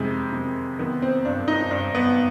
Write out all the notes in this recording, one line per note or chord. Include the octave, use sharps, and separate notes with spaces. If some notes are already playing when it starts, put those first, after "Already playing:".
Already playing: F2 C3 D#3 G#3
C3
D#3 B3
C4
G2 D4
D#4
G2 D4
B3